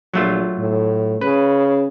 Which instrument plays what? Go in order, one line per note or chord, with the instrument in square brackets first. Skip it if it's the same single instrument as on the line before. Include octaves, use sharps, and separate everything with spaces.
[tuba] A#1 [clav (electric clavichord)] F#3 A3 F4
[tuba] A2
[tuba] C#3 [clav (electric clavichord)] B4